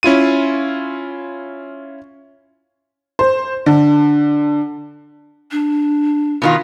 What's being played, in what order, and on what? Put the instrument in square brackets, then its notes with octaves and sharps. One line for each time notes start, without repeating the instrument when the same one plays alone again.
[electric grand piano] C#4 E4 F4 D#7
[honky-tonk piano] C5
D3
[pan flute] D4
[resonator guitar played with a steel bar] B2 D#3 F4